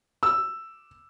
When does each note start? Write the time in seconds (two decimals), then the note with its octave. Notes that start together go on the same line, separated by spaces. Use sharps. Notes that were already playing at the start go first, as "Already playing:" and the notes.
0.23 E6